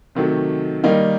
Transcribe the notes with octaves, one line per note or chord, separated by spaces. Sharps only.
C3 D#3 F#3 A3
D#3 G3 A#3 D#4